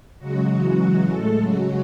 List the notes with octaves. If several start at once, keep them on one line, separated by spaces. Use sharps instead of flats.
C#3 F#3 G#3 F#4
C#3 E3 F#3 G#3 F#4
C#3 E3 G#3
A2 G#3 A3 A4
C#3 F#3 G#3 F#4